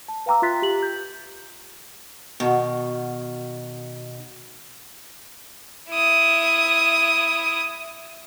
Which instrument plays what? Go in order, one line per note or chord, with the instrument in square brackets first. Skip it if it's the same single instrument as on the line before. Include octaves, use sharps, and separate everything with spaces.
[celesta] A5
B4 F5 G5 A#5 D6 E6
F4 E5 C6 F#6 A6 B6
G4 F#7
G6
[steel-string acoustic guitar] B2 D#3
[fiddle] E4 D#6